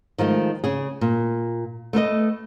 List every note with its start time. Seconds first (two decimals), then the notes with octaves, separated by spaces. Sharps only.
0.18 D#3 F3 G#3 A3
0.64 C#3 G#4
1.01 A#2
1.93 A3 B3 A4 D#5